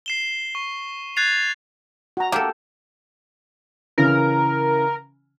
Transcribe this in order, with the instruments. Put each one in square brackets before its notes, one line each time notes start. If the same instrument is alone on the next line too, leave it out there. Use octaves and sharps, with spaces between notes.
[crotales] C7 E7 G7
C#6
F#6 G#6 A6 C7 F7
[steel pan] F#4 A#5
[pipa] A#3 [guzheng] G4 A4
[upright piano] C#3 E3 [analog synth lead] A#4